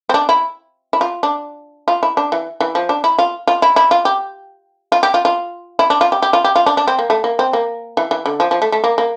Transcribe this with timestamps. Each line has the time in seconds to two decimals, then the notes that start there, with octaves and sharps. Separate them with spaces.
0.09 C4
0.14 D4
0.29 E4
0.93 E4
1.01 F4
1.23 D4
1.88 F4
2.03 E4
2.17 D4
2.32 E3
2.60 E3
2.75 F3
2.89 D4
3.04 E4
3.18 F4
3.47 F4
3.62 E4
3.76 E4
3.91 F4
4.05 G4
4.92 F4
5.03 G4
5.14 F4
5.25 F4
5.79 E4
5.90 D4
6.01 F4
6.12 G4
6.22 G4
6.33 F4
6.44 G4
6.56 F4
6.66 D4
6.77 D4
6.87 C4
6.99 A#3
7.10 A3
7.24 A#3
7.39 C4
7.53 A#3
7.97 E3
8.11 E3
8.26 D3
8.40 F3
8.51 F3
8.62 A3
8.72 A3
8.84 A#3
8.98 A#3